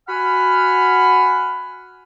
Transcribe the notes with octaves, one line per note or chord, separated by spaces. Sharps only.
F#4 F#5 G#5 B5 F6